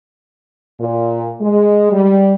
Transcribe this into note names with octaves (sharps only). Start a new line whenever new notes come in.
A#2
G#3
G3